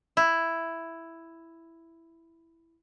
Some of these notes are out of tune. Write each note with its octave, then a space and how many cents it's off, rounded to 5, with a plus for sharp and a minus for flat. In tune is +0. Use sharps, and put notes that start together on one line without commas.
E4 +5